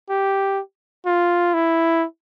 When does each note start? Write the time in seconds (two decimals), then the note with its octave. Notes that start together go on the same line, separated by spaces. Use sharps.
0.09 G4
1.06 F4
1.54 E4